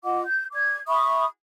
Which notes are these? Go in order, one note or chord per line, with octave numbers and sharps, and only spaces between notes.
F4 D#5 F#5 D6
G6
D5 D6 G#6
E5 B5 C#6 D#6